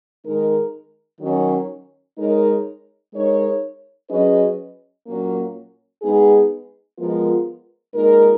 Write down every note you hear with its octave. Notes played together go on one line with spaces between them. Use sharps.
D#3 G#3 D#4 A#4
D#3 F#3 C#4
G#3 D#4 A#4 C#5
G#3 D#4 A#4 C#5
F#3 C#4 G#4 B4 D#5
A#2 F#3 A#3 C#4
G#3 B3 D#4 G#4
F3 G#3 B3 F4 A#4
A#2 G#3 D#4 A#4